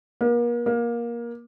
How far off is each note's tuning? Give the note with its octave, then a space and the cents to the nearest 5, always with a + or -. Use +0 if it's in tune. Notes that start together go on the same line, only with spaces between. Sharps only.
A#3 +40
A#3 +20